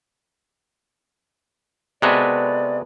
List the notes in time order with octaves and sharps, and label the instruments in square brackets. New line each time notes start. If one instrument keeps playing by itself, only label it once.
[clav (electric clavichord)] C3 G#3 F#4 [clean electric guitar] B3 A4 B4 [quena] D5